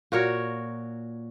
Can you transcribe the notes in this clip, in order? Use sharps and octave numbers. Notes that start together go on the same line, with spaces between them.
A#2 F#4 A#4 C#5